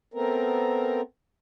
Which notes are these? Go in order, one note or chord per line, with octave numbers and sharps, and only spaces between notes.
A3 B3 C4 A#4